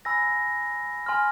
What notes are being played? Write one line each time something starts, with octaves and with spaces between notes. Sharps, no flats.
G#5 B5 E6 A#6
G#5 C6 F6